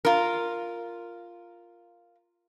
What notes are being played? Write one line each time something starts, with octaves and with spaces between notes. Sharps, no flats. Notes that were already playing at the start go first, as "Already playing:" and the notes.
F4 A#4